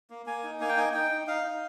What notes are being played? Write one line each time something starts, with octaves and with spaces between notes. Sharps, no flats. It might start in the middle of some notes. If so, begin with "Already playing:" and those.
A#3
A#3 G#5
D#4
A#3 G#5
G5
D#4 G#5
D#4 G5
D#4
D#4 F5
D#4